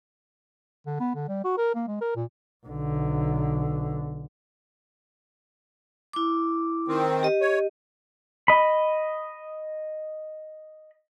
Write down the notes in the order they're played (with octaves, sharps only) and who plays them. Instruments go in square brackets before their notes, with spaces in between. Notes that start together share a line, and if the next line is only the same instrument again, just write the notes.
[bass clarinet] D3
B3
D3
G3
F#4
A#4
A#3
G#3
A#4
A#2
[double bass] B1 D3
[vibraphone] E4 D6
[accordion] D#3 C4
[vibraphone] G4 D#5
[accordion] C#5
[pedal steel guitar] D#5 B5